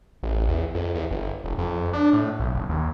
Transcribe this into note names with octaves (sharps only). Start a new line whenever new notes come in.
A1
E2
F2
E2
G1
F1
F2
D4
A2
B1
F#1
D#2